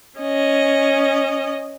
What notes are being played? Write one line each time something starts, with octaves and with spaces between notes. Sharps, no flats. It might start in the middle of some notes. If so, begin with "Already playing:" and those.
C#4 D#5